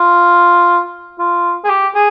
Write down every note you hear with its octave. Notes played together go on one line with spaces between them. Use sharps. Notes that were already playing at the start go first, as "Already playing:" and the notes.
Already playing: F4
F4
G#4
G4
G#4